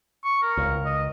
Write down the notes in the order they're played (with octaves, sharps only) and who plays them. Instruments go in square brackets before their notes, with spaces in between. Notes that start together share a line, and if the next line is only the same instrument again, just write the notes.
[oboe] C#6
A#4
[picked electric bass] C#2
[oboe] D#5